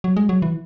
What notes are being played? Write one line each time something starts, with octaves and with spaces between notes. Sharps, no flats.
F#3
G#3
F#3
E3